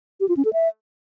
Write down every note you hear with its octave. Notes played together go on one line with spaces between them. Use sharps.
G4
F4
C#4
A4
E5